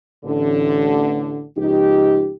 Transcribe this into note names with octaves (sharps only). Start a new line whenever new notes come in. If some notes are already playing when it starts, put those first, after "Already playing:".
A1 D3
C#2 F3 D#4 G4